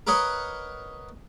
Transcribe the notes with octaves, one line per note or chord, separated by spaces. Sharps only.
A#4 B4 C#5 D#5 F#5